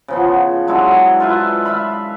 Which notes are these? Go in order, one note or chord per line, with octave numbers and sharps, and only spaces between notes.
C#3 F3 B3
F#3 G#3 D4 E4
F4 B4 E5
E5 F5 B5